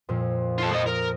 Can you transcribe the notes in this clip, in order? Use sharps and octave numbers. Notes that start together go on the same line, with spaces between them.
F2 A#2 F3
F4 A4
F3 D#5 D#6
A#4